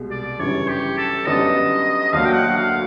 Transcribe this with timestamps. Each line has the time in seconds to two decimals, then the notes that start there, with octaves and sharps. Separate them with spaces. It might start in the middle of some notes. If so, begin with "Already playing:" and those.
Already playing: C2 B2 G#3
0.11 D5
0.39 G1 F#2 C#3 E3 G3 C#5
0.68 G4
0.98 A4
1.26 F#2 D3 G3 B3 D4 D#5
2.13 D2 D3 F#3 A#3 F5
2.25 G5
2.35 F#5
2.56 F5